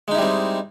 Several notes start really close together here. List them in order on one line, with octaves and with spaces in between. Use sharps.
G#3 D#4 E4 G3 C4